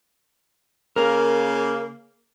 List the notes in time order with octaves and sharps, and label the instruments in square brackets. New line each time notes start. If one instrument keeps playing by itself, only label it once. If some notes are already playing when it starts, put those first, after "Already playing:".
[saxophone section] C#3 A#3 [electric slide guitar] A#4